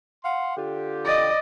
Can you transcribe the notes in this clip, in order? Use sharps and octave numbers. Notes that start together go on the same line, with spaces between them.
F5 F#5 C6
D3 F4 G4
D5 D#5